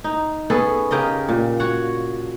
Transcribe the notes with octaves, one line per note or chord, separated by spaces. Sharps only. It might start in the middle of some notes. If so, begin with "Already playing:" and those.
D#4
B3 C#4 G#4 A4
C#3 G4 A#4 D#5
A#2
F#4 C#5 F#5